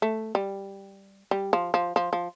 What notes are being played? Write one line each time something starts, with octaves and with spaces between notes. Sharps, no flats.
A3
G3
G3
F3
F3
F3
F3